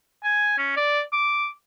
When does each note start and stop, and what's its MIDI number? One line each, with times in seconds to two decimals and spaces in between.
0.23 0.57 80
0.58 0.76 61
0.76 1.01 74
1.12 1.48 86